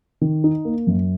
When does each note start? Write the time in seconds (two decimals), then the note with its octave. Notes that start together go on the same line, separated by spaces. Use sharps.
0.21 D#3
0.44 D#4
0.65 A#3
0.87 F#2